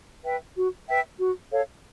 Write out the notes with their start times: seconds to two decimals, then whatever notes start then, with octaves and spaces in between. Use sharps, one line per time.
0.25 B4 E5 G5
0.56 F#4
0.88 B4 E5 G5
1.20 F#4
1.51 A4 C#5 F5